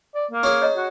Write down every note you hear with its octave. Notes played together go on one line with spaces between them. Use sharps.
D5
A#3
C#4 G#4
C#5 D#5 A#5
F#4